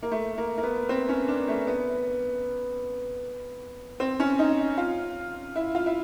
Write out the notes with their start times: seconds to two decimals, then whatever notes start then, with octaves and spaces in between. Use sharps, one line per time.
0.02 A#3
0.11 A3
0.38 A#3
0.57 A#3
0.63 B3
0.89 C4
1.09 C#4
1.28 D4
1.48 A3
1.67 B3
4.00 C4
4.20 C#4
4.39 D#4
4.78 F4
5.56 E4
5.75 F4
5.86 E4